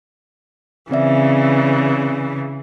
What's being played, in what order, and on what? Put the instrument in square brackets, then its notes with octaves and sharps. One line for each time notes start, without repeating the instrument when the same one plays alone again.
[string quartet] C#3 E3 [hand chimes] C4 D5 E5